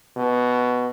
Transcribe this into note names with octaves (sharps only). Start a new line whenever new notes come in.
B2